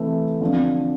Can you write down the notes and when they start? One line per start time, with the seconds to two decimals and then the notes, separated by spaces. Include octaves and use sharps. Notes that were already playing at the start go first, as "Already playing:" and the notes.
Already playing: C3 E3 A3
0.41 F2 D3 F3